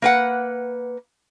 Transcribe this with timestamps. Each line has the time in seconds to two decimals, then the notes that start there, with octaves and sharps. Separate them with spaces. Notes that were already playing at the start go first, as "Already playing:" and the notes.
0.02 A#3 B4 F#5